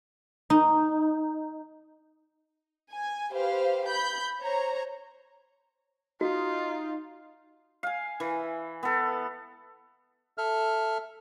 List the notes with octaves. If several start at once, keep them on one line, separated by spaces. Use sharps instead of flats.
D#4
G#5
G4 B4 C5 F5
B5 G6
C5 C#5 A#5
D#4 F4 F#4
F5 G#5
E3
B3 A4
A4 E5 F6